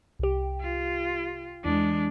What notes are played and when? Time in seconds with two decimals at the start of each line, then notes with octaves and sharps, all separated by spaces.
0.19 C2 G4
0.61 F4
1.64 E2 E3 G#3 D4